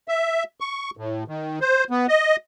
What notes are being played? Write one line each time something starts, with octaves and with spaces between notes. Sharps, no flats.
E5
C#6
A2
D#3
C5
B3
D#5